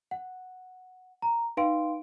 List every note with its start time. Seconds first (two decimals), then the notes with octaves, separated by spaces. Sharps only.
0.11 F#5
1.22 A#5
1.57 D#4 B4 F5 G5 C6 D7